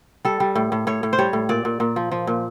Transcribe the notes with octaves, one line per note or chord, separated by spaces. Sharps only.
G3 A4
G3
A2
A2
A2 C#5
A2
C5
G3 C#5
A2
A#2 D5
A#2
A#2
F3
F3
A#2